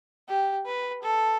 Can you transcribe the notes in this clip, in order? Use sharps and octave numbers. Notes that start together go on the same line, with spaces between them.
G4
B4
A4